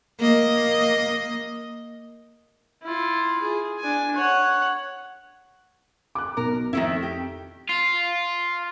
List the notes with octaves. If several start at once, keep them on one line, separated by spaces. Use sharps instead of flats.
A#3 D#5
E4 F4
G#4
D4 G#5
C#5 F#5
D6 F#6
B1 A#4
F2 D#3 A3 E4
G4
F4